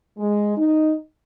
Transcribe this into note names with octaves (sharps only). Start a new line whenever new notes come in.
G#3
D#4